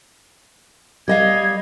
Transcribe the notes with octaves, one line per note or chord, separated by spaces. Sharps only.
G3 D#5 F5 G#6